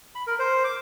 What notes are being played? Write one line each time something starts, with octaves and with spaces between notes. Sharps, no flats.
B5
A#4
C5
D6